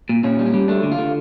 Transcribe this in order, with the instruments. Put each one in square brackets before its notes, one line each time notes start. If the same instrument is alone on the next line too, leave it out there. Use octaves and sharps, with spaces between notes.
[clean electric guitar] A#2
A#2 C#4
G3
C#4
G3
A3 D4
D3
F4
D3